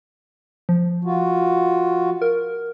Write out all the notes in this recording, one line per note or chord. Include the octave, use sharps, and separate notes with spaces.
F3
F4 F#4
A#4